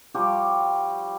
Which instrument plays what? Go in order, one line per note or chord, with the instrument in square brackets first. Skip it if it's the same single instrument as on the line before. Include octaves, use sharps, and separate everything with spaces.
[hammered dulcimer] F3 G3 F#4 G4